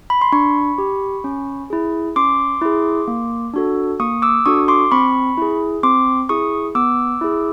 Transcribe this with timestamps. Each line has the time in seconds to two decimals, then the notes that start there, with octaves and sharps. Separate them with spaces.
0.10 B5
0.21 C6
0.32 D4 B5 C#6
0.78 G4
1.24 C#4
1.70 E4 G#4
2.16 C#4 C6 D6
2.62 E4 G#4
3.08 A#3
3.54 D4 F#4 A4
4.00 A#3 C#6 D#6
4.22 D6 E6
4.46 D4 F#4 A4 C#6 D#6
4.68 C6 D6
4.91 C4 B5 C#6
5.38 E4 G#4
5.83 C4 C6 D6
6.29 E4 G#4 C#6 D#6
6.75 B3 D6 E6
7.21 E4 G#4